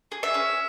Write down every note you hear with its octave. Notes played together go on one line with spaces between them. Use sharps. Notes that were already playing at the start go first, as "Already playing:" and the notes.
G#4
E5
C#4